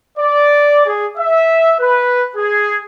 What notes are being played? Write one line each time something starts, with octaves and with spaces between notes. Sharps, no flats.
D5
G#4
E5
B4
G#4